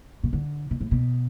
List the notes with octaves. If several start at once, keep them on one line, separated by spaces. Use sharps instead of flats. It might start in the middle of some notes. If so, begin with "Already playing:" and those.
B2
D3
B2
A2
B2